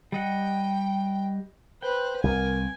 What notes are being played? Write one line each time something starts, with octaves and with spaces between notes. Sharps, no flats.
G3 D#5 F#5 G5
B4 C5 G5
C2 A#4 G#5